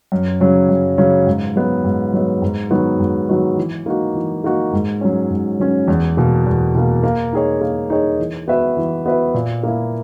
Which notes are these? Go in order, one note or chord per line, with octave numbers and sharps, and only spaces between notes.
F#2
C#3 F#3 C#4
F#2
C#3 F#3 C#4
G#2
F#3 B3
G#2
F#3 B3
G#2
D#3 F#3 B3 F#4
G#2
D#3 F#3 B3 F#4
E3
A#3 D#4 F#4
E3
A#3 D#4 F#4
G#2
F#3 C#4
G#2
F#3 C#4
E2
B2 A#3
E2
B2 A#3
A#3
D#4 G#4 C#5
A#3
D#4 G#4 C#5
E3
B3 F#4 B4 E5
E3
B3 F#4 B4 E5
A#2
A#3 E4